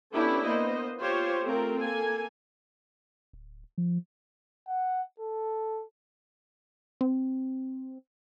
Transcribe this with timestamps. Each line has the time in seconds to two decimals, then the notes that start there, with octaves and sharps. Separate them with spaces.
0.13 B3 C#4 D4 E4 G4 A4
0.46 A#3 B3 C5 D#5
1.00 F4 G4 C5 C#5
1.43 A3 C4 F4 A#4
1.80 A#3 A4 G#5
3.33 D1
3.78 F3
4.68 F#5
5.20 A4
7.01 C4